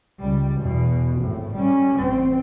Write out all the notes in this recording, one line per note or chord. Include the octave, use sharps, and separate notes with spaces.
C#2 G3
E2 B2
G#1 A2
G3 C#4
A1 C4